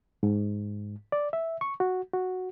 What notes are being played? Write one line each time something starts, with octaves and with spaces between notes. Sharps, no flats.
G#2
D5
E5
C#6
F#4
F#4